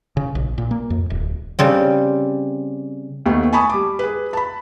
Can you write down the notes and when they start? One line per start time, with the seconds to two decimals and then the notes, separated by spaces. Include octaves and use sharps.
0.17 C#3
0.35 A#1
0.58 A#2
0.71 A#3
0.90 F2
1.10 D1
1.59 C#3 G3 C4
3.26 D#2 A3 B3
3.53 G#5 A5 B5 C#6 D#6
3.70 G3 D6
3.99 G#4 B4
4.33 A5 B5